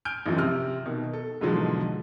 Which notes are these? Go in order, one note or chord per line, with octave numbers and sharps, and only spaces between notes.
G#5 F6 G6 D7
A1 F#2 F3
C3 F6
B2 D#3
A4
E2 G#2 B2 D3 F3 F#3